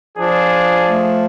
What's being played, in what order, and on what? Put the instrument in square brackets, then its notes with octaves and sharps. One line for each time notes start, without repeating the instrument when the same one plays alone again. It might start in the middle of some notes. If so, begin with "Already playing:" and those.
[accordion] F3 [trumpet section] D4 G#4
[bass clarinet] A3